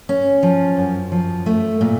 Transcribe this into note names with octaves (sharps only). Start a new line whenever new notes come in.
C#4
F3
F#2
F3
A3
A#2